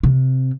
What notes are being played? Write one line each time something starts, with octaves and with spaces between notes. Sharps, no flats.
C3